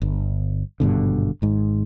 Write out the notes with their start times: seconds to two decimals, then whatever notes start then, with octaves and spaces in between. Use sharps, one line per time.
0.02 G1
0.80 G#1 G2 B2 D3
1.42 G#1 G#2